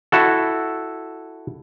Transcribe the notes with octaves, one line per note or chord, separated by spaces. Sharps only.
E4 F#4 A4